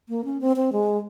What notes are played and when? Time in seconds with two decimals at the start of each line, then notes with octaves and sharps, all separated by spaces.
0.09 A#3
0.25 C#4
0.41 C4
0.56 C4
0.73 G#3